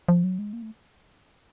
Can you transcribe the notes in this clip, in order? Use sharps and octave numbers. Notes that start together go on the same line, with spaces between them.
F3
F#3
G#3
A#3
A3